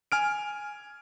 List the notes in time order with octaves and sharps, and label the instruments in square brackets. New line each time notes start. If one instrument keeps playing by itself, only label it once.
[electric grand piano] G#5 F6 D7